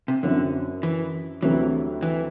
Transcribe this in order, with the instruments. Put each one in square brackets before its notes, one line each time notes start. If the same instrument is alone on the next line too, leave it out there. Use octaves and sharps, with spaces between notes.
[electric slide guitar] C3
[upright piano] F#2 F#3 C4 E4 [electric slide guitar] D3
[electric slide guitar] E3
[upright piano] D2 C3 F#3 [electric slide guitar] E3
[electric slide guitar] E3